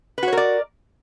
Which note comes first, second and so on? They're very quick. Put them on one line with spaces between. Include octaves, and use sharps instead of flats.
B4 F#4 C#5 A#4 D5